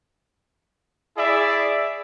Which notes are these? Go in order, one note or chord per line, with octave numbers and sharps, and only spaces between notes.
E4 G#4 D5 E5